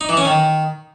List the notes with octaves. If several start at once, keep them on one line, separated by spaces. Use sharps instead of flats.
D#4
E3
C#4
D#3